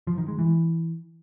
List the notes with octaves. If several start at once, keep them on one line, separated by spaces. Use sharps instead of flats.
F3
D#3
G#3
E3